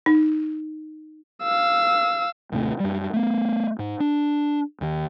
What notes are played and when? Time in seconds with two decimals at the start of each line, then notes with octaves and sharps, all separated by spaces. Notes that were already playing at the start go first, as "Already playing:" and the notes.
0.06 D#4
1.43 F5 E6
2.52 D#2 A2 C3 A3
2.80 F#2 G3
3.13 A3 B3
3.79 G#2
4.00 D4
4.81 D#2 D#3